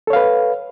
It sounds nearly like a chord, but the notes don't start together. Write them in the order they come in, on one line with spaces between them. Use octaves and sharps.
A4 C#5 F5 B4